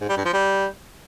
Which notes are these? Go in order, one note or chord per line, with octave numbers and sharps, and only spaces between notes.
G#2
G3
G2
F3
G3